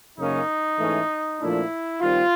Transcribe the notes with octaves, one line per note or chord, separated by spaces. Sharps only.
F#2 C#3 F#3 A#3 C#4 D#4
G#2 E3 A3 C#4
A#2 F3 A3 D4 E4
D#3 G3 C4 F4